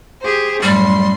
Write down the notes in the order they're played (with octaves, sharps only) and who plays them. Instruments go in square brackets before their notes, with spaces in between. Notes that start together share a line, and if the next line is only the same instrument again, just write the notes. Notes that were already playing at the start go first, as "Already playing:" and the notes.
[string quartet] G4 G#4 C5
[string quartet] F#2 A2 C6 [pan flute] G3